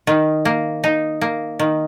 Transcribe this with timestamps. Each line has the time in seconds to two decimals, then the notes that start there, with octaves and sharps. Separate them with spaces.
0.07 D#3
0.45 A#3
0.84 D#4
1.21 A#3
1.59 D#3